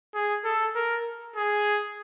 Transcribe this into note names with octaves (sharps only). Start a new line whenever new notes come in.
G#4
A4
A#4
G#4